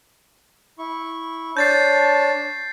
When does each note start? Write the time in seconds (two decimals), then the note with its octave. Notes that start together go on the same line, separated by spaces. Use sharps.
0.79 E4 C#6
1.57 D4 C#5 A5 G6 A6 C7